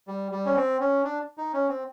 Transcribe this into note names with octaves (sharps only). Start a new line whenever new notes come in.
G3
G3
C#4
C4
C#4
D4
D#4
C#4
C4